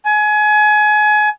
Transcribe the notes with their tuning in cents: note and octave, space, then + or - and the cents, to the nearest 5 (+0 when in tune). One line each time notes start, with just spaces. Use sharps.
G#5 +30